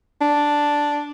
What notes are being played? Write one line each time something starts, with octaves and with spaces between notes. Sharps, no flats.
D4